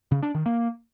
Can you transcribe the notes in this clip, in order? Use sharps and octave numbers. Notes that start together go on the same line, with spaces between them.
C#3
D4
D#3
A#3